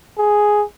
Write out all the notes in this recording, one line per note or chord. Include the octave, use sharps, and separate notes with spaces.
G#4